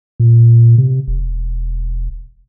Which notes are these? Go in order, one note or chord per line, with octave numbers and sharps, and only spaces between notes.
A#2
C3
E1